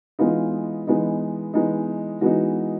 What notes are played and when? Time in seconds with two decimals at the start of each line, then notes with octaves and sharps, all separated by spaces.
0.19 E3 G#3 B3 D#4 F4
0.87 E3 G#3 B3 D#4
1.54 E3 G#3 B3 D#4
2.21 E3 G#3 B3 D#4 F#4